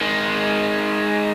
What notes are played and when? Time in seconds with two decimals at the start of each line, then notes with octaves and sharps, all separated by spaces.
0.01 D#3 G#3